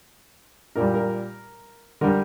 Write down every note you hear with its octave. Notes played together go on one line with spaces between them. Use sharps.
A#2 G3 A#4
A#4
D3 G3 A#4